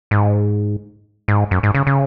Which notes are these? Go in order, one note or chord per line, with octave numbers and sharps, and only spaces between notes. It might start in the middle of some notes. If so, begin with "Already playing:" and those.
G#2
G#2
F#2
G#2
C#3
C#3